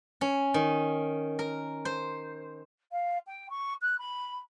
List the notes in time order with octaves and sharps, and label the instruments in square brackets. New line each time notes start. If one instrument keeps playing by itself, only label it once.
[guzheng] C#4
D#3
A#4
C5
[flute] F5
G5
C#6
F#6
B5